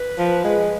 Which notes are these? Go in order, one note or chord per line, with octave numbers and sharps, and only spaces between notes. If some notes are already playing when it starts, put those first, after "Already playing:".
Already playing: B4
F3
G#3